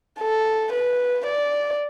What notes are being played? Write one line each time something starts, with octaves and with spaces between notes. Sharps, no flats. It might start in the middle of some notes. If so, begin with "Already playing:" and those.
A4
B4
D5